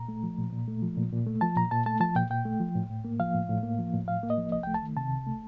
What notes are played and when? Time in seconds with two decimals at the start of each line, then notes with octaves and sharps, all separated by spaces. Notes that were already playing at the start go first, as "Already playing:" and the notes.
Already playing: A#2 A#5
0.08 A3
0.23 F3
0.38 A#2
0.53 A#2
0.68 A3
0.82 F3
0.97 A#2
1.12 A#2
1.27 A3
1.41 F3 A5
1.56 A#2 A#5
1.71 A#2 A5
1.86 A3 A5
2.00 F3 A5
2.16 A#2 G5
2.30 A#2 G5
2.45 A3
2.60 F3
2.75 A2
2.90 A2
3.05 A#3
3.20 F3 F5
3.34 A2
3.49 A2
3.63 A#3
3.79 F3
3.93 A2
4.08 A2 F5
4.23 A#3
4.30 D#5
4.37 F3
4.52 C2 D#5
4.63 A3 G5
4.74 A5
4.82 D#3
4.97 C3 A5
5.12 C2
5.26 A3